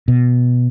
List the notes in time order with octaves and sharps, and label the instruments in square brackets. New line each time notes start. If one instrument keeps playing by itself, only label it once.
[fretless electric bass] B2